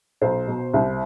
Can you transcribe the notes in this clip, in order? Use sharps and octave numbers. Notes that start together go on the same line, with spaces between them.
B1 C5
B2
C2